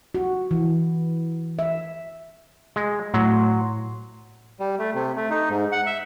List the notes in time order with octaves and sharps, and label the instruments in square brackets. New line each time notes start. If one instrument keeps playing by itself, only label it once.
[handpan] F#4
E3
E5
[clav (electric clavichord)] G#3
[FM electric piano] A2 C6 [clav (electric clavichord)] F#3
[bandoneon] G3
A3
C3
A3
D#4
G#2
F#5
E5